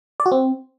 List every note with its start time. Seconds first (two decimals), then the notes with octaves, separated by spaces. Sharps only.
0.20 D5
0.26 F#4
0.32 C4